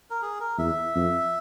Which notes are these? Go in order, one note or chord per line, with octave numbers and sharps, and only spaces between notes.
A#4
G#4
A#4
E2 E5
F2